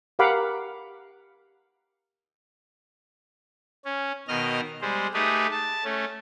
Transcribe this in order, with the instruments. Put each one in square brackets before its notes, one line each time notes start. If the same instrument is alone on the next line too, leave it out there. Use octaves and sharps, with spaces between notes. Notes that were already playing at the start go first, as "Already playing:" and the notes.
[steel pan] G4 A#4 F5 F#5 B5 D6
[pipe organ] C#4
B2 D#3 D#5 F6
G3 G#3 C5
A3 D#4 G4 G#4 B4
A5
A3 C#4